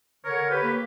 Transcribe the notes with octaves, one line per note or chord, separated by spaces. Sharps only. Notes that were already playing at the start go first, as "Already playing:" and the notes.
D3 A#4 C#5
G4 B4
A#3